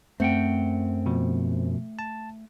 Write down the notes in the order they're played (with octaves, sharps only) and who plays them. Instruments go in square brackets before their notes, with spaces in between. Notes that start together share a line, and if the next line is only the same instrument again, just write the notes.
[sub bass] F#2 [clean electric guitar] A3 F#5 G5 [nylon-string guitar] C4
[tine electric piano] B2 F3
A5